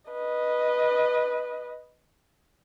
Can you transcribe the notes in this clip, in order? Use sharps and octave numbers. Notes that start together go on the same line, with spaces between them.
B4 D#5